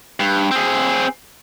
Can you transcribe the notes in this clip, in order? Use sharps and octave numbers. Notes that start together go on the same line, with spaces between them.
G2
C4 G#4